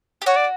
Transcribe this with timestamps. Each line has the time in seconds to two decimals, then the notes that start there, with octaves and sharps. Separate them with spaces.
0.22 G4
0.26 F#4 C#5
0.36 D5